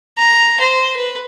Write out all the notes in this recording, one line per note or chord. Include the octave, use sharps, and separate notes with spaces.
A#5
C5
B4